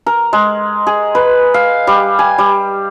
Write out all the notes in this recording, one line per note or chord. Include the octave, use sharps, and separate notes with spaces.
A#4
G#3
G#4
B4
F5
G3
G#5
G3